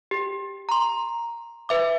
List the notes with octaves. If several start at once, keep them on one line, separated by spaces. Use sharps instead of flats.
G4
A#5 C6
B4 E5 D6